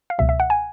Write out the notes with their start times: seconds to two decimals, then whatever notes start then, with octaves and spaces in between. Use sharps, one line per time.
0.10 F5
0.18 C#2 B2 F#3 E5
0.29 E5
0.40 F#5
0.50 G#5